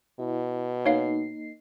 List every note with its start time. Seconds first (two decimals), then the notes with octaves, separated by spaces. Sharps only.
0.20 B2 E4
0.86 A#3 D#4 C#5 F5 C7